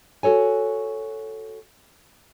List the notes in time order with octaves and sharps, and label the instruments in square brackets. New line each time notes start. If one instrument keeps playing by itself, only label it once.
[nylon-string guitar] F#4 A4 C#5 G#5